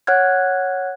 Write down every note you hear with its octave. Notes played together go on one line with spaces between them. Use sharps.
C#5 F#5 F6 F#6 G#6